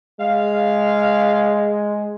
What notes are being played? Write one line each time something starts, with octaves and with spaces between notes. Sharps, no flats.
G#3 F5